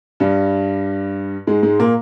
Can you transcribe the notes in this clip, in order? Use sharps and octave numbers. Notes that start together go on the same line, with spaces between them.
G2 G3
G#2 G#3
G#2 G#3
A#2 A#3